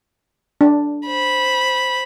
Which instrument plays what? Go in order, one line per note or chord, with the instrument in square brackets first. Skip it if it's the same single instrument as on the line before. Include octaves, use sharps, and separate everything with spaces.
[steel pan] D4
[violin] C5 B5